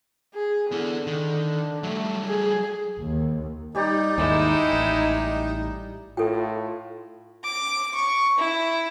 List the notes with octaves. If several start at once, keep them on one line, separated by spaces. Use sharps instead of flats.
G#4
D3 B3 E4
D#3
F#3 G3 A3
G#4
D#2
G3 D#4 G4 D5
D#2 G#2 G#3 E4
A1
A2 F4 A4 G5
D6
C#6
E4